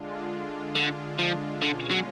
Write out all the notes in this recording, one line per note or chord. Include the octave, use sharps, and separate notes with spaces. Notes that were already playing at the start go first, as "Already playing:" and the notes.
Already playing: D3 G#3 D4 F4
D3
F3
B2 D3 G#3 C#4 F4
F#3